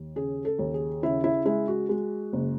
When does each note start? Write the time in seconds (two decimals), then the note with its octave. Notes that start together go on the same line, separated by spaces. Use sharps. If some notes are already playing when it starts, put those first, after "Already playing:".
Already playing: D#2
0.16 C#3 G#4
0.45 A4
0.59 D#2
0.74 G#4
1.03 C#3 E4
1.24 E4
1.46 G#3 E4
1.68 F#4
1.89 G#3
2.33 F#1